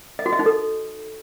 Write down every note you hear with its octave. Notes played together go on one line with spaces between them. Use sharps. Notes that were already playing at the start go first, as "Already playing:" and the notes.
D#5
F#4
D#5
D#4
A4